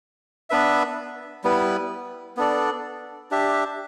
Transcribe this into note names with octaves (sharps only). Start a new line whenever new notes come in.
B3 D4 B4 E5
G3 B3 E4 B4
B3 D4 A4 D5
D4 G4 E5